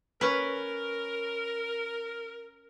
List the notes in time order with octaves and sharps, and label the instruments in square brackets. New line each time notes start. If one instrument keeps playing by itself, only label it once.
[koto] C#4 B4 [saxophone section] A#4